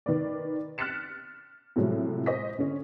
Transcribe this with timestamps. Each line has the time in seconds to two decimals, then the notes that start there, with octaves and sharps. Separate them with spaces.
0.06 D#3 B4 D5
0.78 F6 F#6 A6 B6 C#7 E7
1.76 A2 C3 F3 F#3 G#3
2.26 C5 D#5 B6
2.58 D3 C#4